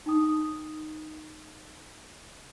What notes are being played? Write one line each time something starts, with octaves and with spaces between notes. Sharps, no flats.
D#4 G5 D#6